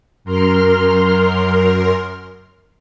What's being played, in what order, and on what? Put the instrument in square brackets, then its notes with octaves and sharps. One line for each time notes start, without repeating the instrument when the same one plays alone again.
[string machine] F#2 A#4 C6 F6